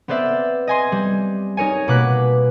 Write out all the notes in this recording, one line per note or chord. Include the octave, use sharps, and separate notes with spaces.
B3 C4 C5 D5 E5
D#5 G#5 C6
G3
D#4 A#4 C#5 G#5
B2 A#3 D6 F#6 B6